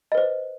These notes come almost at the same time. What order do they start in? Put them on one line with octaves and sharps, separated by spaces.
D#5 B4 C5